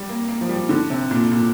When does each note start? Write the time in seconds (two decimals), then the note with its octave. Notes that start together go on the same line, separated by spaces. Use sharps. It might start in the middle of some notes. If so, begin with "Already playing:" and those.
Already playing: G3
0.09 A#3
0.28 A#3
0.41 F3
0.49 G3
0.69 D3
0.90 C3
1.11 A#2
1.31 A#2